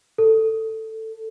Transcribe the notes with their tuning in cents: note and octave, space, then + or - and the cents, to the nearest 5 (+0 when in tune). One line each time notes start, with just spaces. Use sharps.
A4 +10